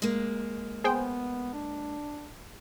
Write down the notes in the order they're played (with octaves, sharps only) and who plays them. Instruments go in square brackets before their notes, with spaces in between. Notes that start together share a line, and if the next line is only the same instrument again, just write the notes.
[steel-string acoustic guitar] G#3 A#3
[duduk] B3 [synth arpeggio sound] G#4 C5 G5
[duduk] D4